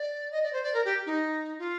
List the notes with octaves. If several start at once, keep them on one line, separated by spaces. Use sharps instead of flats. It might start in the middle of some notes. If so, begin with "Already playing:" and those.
Already playing: D5
D#5
D5
C5
D5
A#4
G4
D#4
F4